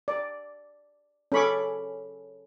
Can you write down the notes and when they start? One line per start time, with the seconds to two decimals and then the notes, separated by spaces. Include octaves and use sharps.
0.08 D5
1.32 C#4 A4 B5 C#6 D6